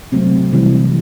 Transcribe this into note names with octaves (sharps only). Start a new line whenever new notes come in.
C3 F#3 A3 C4
C3 E3 G3